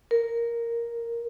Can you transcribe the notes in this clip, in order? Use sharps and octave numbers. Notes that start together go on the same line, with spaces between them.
A#4